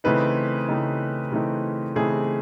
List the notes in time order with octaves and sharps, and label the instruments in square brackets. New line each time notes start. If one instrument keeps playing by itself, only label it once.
[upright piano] C#3 E3 A3 C4 D#4 B4
C#3 E3 A3 C4 D#4
C#3 E3 A3 C4 D#4
C#3 E3 A3 C4 D#4 G#4